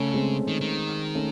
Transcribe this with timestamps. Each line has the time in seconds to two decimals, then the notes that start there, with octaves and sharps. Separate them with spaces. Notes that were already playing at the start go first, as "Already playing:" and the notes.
Already playing: C#3 A3 C#4
0.14 G#3 C4
0.48 D#3
0.61 D#3
1.15 A3 C#4